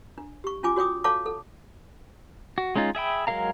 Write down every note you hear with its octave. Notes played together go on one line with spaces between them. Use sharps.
D4
G4 C#6
C#4 F4 G#5 D6
F#4 C#5 G5 D6 D#6
A4 C#5 F5 A5 D6
A4
F#4
G#3 C#4 D#4 F4
G#4 E5 G5 B5
F#3 G#3 A#4 F5 A#5